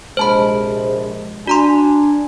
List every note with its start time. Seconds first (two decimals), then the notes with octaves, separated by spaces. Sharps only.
0.17 A#1 C3 G#3 C5 A5 B5
1.47 D4 F#4 G#5 A#5 C6